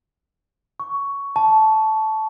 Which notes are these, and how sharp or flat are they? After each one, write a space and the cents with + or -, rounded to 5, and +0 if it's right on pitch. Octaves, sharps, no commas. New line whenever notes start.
C#6 +10
A5 -10